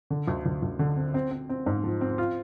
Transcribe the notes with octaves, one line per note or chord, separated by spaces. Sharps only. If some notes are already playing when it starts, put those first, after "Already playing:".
D3
D2
D2
D2
D3
C4
C4
C4
C4
G#2
F3
C4
F4